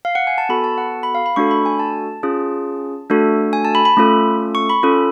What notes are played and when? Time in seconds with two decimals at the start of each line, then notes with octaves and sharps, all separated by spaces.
0.05 F5
0.15 F#5
0.27 G#5
0.38 A5
0.49 B3 F#4 A4 B5
0.64 A5
0.78 F#5
1.03 B5
1.15 F5
1.26 B5
1.36 A3 D4 F#4 A4 C#6
1.51 B5
1.66 G#5
1.79 A5
2.23 C#4 F4 G#4
3.10 A3 D4 F#4 A4
3.53 G#5
3.65 A5
3.75 B5
3.85 B5
3.97 A3 C#4 F4 A4
4.55 C#6
4.70 B5
4.83 C#4 F4 A4